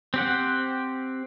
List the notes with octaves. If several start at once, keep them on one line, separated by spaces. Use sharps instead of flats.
C4 G4 F#5